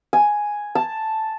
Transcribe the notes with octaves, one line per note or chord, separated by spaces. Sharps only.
G#5
A5